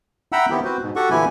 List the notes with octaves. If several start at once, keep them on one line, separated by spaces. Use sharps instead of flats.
E5 F#5 G5 A#5 B5 E6
D#3 B3 C4 E4 G4
C4 F#4 B4 C5
G#2 B2
F#4 G4 A4 F#5 C#6
A#2 D3 E3 E4 G4 G#5